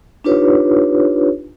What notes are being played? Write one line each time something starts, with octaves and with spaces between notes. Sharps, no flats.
D4 D#4 F4 G4 B4 C#5